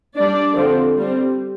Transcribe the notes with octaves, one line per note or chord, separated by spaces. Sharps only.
G3 D4 D5
D3 F3 C4
G3 C4